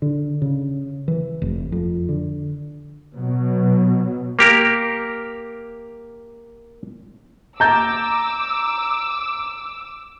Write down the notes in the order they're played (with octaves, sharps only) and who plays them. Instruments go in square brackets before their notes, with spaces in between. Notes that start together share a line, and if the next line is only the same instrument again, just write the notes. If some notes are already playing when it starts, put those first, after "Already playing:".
[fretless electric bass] D3
C#3
E3
F1
F2
D3
[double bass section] B2 F#3
[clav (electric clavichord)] A#3 G4 A#4
[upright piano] A#5 G6 A6 [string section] D6 E6